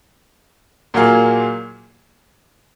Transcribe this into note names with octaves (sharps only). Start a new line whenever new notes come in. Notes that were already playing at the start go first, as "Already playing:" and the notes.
A#2 F#3 A#3 F4 G#4